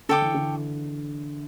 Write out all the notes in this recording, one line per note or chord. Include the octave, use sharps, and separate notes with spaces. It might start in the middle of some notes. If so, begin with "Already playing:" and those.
D3 A4 C#5 G5 D6
E3
D3